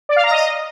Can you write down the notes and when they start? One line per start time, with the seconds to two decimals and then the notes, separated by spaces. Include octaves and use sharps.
0.09 D5
0.16 F5
0.24 A#5
0.31 D#5